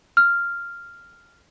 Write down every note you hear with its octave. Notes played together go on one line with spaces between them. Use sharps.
F6